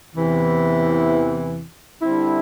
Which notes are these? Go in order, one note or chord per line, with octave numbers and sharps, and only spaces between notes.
E2 C3 E3
D3 G3 C4 E4